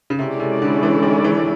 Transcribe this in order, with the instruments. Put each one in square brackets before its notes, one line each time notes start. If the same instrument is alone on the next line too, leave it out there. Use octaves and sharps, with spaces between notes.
[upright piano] C#3
[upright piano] C3 [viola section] G#3 C#4 E4 A4 D5
[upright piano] C3
D3
E3
D#3
E3